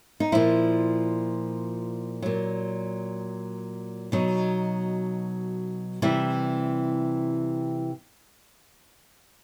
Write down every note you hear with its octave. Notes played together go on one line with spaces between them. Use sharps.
D#4
A#2 F3 E4
A#2 F#3
B2 F#3 D#4
C3 E3 G3 E4